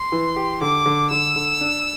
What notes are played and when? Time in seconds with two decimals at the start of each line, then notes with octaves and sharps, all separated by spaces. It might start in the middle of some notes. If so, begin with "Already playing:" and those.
Already playing: C6
0.12 E3
0.36 G4
0.61 D3 D6
0.86 D3
1.11 D3 E6
1.36 D3
1.61 D4